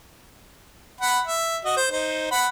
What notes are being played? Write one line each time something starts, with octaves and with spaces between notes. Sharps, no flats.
F#5 B5
E5
F#4 D#5
C5
D#4 C5
F#5 B5